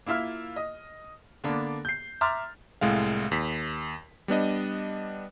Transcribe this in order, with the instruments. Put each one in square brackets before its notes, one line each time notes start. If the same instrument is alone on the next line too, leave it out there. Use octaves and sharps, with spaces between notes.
[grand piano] A#3 E4 F4 E5 F6
D#5
D3 A#3 B3 D4
G6 C7
E5 A#5 C6 D6 F6 A6
[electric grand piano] C2 A2 G#3 F5
D#2 B6
G3 B3 D4 D#5